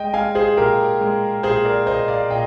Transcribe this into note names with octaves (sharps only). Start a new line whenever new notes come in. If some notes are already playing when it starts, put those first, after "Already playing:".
Already playing: G#3 D#5 G5
G#3 F5 G#5
G#4 C5
A#2 G4 A#4
G#3
A#2 G#4 C5
A#4 D5
A#2 C5 D#5
D5 F5
A#2 D#5 G5